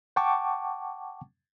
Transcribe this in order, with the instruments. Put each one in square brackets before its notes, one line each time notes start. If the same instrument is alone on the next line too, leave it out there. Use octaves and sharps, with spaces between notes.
[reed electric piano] F#5 G5 A5 C#6 D6